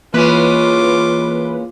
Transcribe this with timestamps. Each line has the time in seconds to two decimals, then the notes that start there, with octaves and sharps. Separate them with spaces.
0.14 E3 G#3 A#3 C#4 F4 B4 D6